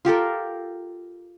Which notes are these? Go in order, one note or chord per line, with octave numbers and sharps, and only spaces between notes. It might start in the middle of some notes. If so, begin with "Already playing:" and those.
F4 G4 A4 A#4